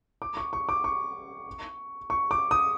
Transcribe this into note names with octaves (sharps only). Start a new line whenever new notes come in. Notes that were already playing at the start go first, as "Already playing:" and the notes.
D6
C#6
C#6
D6
C#6
C#6
D6
D#6